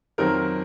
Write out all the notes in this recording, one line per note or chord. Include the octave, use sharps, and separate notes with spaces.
F2 D#3 F#3 C4 A#4